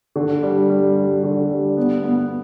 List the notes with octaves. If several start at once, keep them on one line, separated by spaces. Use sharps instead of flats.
D3
G3
G3
G3
D3
G3
B3
B3